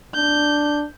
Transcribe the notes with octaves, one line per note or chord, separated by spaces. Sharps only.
D4 G6